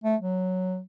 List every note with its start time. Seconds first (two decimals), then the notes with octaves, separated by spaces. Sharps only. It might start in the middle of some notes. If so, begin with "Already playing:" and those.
0.04 A3
0.21 F#3